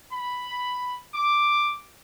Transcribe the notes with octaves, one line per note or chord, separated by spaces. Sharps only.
B5
D6